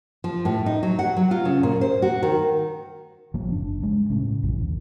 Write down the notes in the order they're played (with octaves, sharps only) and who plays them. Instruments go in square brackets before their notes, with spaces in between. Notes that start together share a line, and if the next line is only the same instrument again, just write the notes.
[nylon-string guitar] F3
A2
D#4
F#3
F#5
F#3
F4
C#3
A#2
C5
F#4
D#3
[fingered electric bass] A1 F3 F#3 A#3
F#1 D4
G2 G#3
A2 C#3
A#1 F#2 A#2 E3
D#2